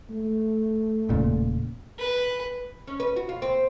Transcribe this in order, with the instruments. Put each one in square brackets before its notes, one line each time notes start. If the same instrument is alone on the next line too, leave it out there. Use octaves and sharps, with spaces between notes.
[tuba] A3
[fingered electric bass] E1 A#2 C#3
[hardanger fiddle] B4
[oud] C#4
B4
F#4
F4
C4